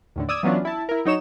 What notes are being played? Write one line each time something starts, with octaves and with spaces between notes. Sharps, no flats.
D#2 A2 D3
D5 D#6 E6 G#6
E3 F#3 B3 C#4 D4 F4
E4 A5
E4 A#4
F#3 D#4 C#5 E7